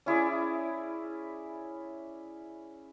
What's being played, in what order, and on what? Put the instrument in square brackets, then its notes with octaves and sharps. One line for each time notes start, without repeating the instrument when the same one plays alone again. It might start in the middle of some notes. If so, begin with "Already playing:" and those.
[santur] C#4 E4 G#4 D5